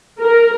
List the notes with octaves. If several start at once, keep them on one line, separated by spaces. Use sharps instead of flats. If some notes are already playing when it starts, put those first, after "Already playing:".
A#4